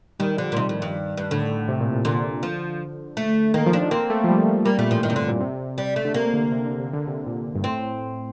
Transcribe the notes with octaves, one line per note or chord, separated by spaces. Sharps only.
D#3 G3
D3 F3
A#2
C3 D#3
A2
G2
G2
A2 D3
C3
A#2
C3
A#2 D3
F3
A3
D#3 A#3
F3
D4
F3
A#3 C4
A3
F3
G3
G3 A#3
A#2 A3
A2 F3
G2 D#3
C3
A2 D3
A#2
C3
G3
A3
D3
C3 A#3
D3
C3
D3
C3
D3
C3
A#2
G2
A2 C4